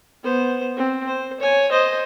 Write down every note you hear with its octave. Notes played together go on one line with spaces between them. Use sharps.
B3 C5
C4
C5
C#5 G#5
C5 D#5